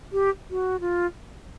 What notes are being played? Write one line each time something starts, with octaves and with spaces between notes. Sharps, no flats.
G4
F#4
F4